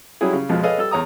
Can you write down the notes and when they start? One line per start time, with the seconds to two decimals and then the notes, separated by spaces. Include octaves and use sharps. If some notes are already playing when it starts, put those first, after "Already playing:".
0.21 F#3 G3 C#4 E4 G#4
0.33 C#3
0.49 F2 B2 F3 G#3
0.63 G#4 A4 B4 C#5 D#5 F5
0.78 G3 A4 E6
0.91 E2 C#5 A#5 D#6